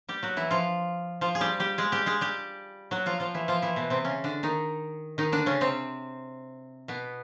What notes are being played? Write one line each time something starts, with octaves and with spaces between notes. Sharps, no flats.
G3 G4
F#3 F#4
E3 E4
F3 F4
F3 F4
G#4
G3 G4
G3 G4
G#3 G#4
G3 G4
G#3 G#4
G3 G4
F#3 F#4
F3 F4
F3 F4
E3 E4
F3 F4
E3 E4
B2 B3
C3 C4
C#3 C#4
D3 D4
D#3 D#4
D#3 D#4
D3 D4
C#3 C#4
C3 C4
B2 B3